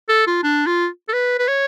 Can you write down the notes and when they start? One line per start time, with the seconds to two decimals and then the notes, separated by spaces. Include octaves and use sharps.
0.09 A4
0.27 F4
0.43 D4
0.67 F4
1.09 A4
1.13 B4
1.39 B4
1.48 C#5